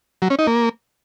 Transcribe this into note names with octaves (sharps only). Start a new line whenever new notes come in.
F#3
C#4
D#4
A#3